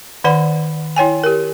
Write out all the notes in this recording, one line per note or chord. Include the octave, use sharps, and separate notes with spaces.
D#3 B4 D5 F#5 B5
E4 C#5 G5 G#5
G4 A#4